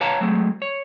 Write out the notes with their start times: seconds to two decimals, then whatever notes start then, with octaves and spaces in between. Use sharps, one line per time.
0.01 B4 C#5 F5 A5 A#5
0.21 F#3 G#3 A3 C4
0.62 C#5